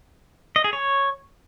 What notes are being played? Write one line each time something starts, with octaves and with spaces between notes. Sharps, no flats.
D#5
G#4
C#5